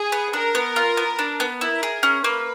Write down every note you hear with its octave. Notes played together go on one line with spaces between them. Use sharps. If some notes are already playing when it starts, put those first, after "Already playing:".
Already playing: G#4
B3
D4 A#4
B3
F4
B3
D4
B3
E4 A#4
G#4
C#4
A#3 B4